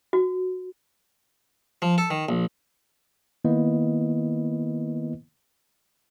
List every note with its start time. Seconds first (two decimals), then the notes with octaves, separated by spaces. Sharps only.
0.13 F#4
1.82 F3
1.98 A4
2.11 D#3
2.29 A#1
3.44 D#3 A#3 B3 E4 B4 D#5